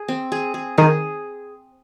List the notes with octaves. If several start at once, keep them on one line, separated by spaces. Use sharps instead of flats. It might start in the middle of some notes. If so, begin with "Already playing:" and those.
Already playing: G#4
C4
G#4
G#4
D#3 G#4